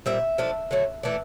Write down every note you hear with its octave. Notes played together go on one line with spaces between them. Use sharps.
A#2 G3 C4 E5
F3 A3 D4
D3 F#3 A3
E3 A3 D4